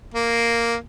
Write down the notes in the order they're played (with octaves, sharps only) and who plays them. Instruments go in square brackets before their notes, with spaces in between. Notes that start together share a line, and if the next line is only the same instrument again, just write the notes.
[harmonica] A#3